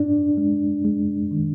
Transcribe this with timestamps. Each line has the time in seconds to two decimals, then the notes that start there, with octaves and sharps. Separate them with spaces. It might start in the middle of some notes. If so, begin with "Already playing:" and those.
Already playing: G#2 D4
0.37 G#3
0.85 G#3
1.31 D#3